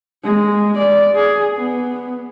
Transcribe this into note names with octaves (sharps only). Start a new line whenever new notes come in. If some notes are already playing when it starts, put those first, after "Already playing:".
G#3
D5
G#4
B3